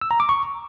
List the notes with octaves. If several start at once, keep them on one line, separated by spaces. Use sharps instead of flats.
E6
A#5
D6
C#6